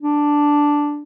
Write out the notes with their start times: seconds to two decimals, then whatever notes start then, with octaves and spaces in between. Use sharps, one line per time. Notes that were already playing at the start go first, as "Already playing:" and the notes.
0.02 D4